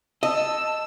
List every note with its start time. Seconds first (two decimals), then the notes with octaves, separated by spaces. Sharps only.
0.23 D#5 A5 E6